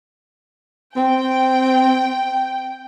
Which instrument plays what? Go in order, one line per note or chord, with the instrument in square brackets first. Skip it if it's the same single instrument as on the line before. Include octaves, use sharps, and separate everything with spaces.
[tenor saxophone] C4 [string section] G5